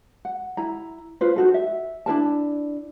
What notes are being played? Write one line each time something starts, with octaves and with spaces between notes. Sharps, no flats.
F#5
E4 A#5
F4 B4 C5
D#4 F#4 A4
E5
D4 E4 A#4 A5